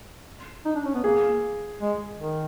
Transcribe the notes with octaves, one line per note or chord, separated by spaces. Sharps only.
D#4
D4
C#4
B3
A#3 G#4
G#3
D#3